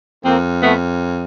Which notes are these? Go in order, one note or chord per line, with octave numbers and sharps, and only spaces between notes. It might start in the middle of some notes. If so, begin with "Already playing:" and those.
F2 A#3 C4
A3 B3